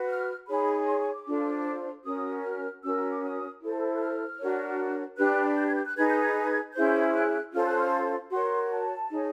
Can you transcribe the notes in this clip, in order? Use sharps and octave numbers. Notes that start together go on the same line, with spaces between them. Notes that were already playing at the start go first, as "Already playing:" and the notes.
Already playing: F#4 B4
F6
D#4 G#4 C#5 B5
C6
C#6
D6
D4 F4 A4 C5
C#4 F#4 A#4 C#5 D#6
F6
C#4 F#4 A#4 E6
D6
D#6
E4 A4 C5
F#6
F6
D4 F#4 A#4 C#5
D4 G4 B4 F#6
G6
G#6
G6
F#6
D#4 G#4 B4 G#6
G6
G#6
C#4 E4 G#4 C5 G6
F#6
C#4 F4 A4 C5 F6
F#6
F6
F#4 A#4 C#5 C6
A5
D#4 G#4 C#5